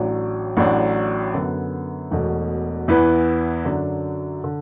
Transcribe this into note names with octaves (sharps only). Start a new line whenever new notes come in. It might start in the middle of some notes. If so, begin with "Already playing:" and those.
Already playing: A1 A2 F#3 D4
A1 A2 F#3 D4 F#4
F#2 D3 B3
E1 E2 B2 A3
E2 E3 B3 E4 B4
F#2 D3 F#3 D4
D3